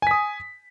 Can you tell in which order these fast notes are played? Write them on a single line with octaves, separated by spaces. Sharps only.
G#5 B6 D#6